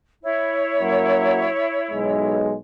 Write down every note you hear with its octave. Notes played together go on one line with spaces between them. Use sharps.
E4 C#5
F#2 F#3 A#3
B1 G#3